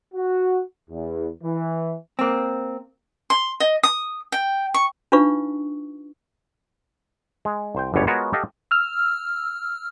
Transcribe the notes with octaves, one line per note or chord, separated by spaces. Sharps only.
F#4
E2
E3
A#3 C4
C6
D#5
D#6
G5
C#6
D4 D#4 F4 B4 F5 C#6
G#3
C2 C5 G5
G1 C#2 F#2 G3 B3 C#5
G#3 B3 F4 F#4 A#4 C#5
G4 A4 D#5 F5 F#5
E6 F6